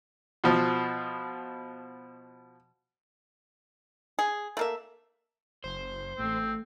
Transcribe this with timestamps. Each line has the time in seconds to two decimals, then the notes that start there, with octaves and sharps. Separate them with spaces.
0.44 B2 F3
4.19 G#4
4.57 A3 A#3 E5
5.64 F#1 C5
6.19 A1 A3 C4